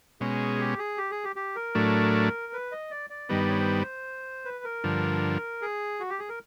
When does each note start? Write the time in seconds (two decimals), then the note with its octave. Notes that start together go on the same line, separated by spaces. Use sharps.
0.21 B2 G#3 C#4 G#4
0.59 G4
0.78 G#4
0.98 G4
1.11 G#4
1.24 G4
1.36 G4
1.56 A#4
1.75 A2 F#3 A3 D4
2.53 B4
2.72 D#5
2.91 D5
3.10 D5
3.29 G2 D#3 G3 B3 D#5
3.39 D5
3.49 C#5
3.58 C5
4.45 B4
4.64 A#4
4.84 G2 D3 F3
5.62 G#4
6.00 F#4
6.10 G4
6.19 G#4
6.29 A#4